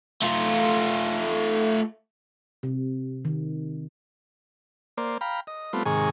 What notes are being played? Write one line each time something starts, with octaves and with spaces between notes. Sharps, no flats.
A3 F4
C3
D#3
A#3 C5 D5
F5 G5 A#5 B5
D#5
G3 A3 B3 C4 F4
G#2 C3 D#3 G#4 G#5 C#6